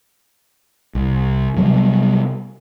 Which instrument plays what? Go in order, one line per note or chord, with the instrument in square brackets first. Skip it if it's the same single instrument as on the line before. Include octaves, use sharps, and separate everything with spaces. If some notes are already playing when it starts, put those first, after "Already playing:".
[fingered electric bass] C2
C3 F#3 G3 B3